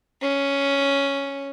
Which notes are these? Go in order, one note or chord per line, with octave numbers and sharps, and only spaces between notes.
C#4